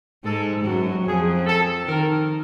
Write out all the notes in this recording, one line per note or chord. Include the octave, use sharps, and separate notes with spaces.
G#2 G#3 A4
F#2 F#3
F2 F3 G#4
A4
D#3 A#4